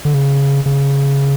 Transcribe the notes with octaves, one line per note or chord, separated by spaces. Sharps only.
D3
C#3
C#3